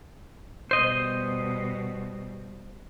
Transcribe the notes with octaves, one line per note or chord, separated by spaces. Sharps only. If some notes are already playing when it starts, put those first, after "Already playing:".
B2 G3 C5 D#5